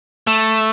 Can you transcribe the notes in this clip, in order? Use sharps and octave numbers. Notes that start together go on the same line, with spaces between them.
A3